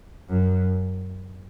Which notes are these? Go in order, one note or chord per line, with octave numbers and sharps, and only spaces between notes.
F#2